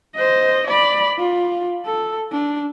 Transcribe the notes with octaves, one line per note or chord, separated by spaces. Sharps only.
C5 D#5
D5 B5
F4
A4
D4